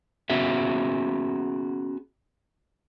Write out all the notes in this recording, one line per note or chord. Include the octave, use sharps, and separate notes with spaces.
B3 C#4 F#4 G#4 E5